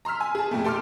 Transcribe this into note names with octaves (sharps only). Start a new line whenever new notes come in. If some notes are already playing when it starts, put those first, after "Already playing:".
A#5 C6 E6 F6 B6
G#5
G#4 A5
F2 A#2 A3
G4 A4 C6 D6 F6